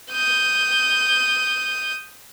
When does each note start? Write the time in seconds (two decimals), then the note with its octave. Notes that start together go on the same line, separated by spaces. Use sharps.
0.12 D#6 G6